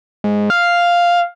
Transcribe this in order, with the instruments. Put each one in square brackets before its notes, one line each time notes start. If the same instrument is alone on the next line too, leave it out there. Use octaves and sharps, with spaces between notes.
[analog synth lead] G#2
F5